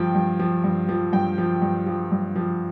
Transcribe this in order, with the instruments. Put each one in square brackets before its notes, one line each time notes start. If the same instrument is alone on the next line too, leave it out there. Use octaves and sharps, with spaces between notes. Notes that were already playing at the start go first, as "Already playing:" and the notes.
Already playing: [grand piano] G2 F3 G5
G2
F3
G2
F3
G2 G5
F3
G2
F3
G2
F3